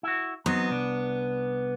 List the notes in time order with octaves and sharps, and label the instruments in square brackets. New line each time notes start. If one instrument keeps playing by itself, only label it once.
[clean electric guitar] E4 F#4
[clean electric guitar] F#3 C4 D#4 [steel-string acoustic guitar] B3
[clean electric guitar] C2 D4